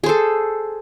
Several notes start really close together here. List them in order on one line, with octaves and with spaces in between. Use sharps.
G#4 C5 A4